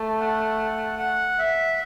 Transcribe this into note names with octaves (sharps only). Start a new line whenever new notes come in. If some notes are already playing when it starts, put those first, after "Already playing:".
Already playing: A3
F#5
F#5
E5